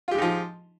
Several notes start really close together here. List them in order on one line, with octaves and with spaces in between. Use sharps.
F4 G4 G#3 D#4 F3